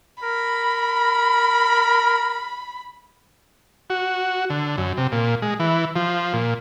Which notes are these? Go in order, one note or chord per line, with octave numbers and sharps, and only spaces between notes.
A#4 B5
F#4
D3
F#2
C3
A#2
G#3
E3
F3
A#2